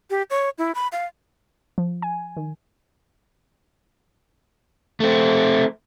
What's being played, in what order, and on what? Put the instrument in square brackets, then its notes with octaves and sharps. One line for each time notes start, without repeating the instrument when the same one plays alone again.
[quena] G4
C#5
E4
B5
F5
[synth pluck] F3
G#5
D#3
[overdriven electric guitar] A3 C4